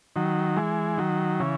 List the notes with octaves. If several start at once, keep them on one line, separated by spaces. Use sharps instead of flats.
D#3 F#3
E3 G#3
D#3 F#3
C#3 E3